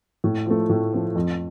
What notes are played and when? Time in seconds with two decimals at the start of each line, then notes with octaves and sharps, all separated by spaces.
0.24 A2
0.46 F3 A3
0.70 A2
0.93 F3 A3
1.15 F2